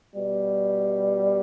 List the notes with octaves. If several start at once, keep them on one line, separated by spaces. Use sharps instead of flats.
B2 G3